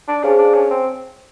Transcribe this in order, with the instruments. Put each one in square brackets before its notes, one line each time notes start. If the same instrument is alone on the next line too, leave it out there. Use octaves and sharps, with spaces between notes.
[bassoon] D4
[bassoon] C#4 [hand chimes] G#4 C5 F5 A5
[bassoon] D4
C#4
C4